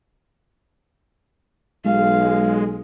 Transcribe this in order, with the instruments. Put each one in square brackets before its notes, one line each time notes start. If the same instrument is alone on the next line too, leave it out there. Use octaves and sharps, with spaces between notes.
[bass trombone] B1 [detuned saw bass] G#3 [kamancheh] F5